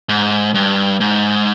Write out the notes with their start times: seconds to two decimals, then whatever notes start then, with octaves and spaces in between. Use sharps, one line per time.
0.09 G#2
0.55 G2
1.00 G#2